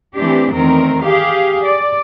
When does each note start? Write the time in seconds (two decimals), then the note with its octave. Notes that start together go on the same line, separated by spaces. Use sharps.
0.15 E3 A3 C4 D4 G4
0.53 E2 D#3 A3 C4 A#4
1.04 G4 G#4 F5
1.64 D5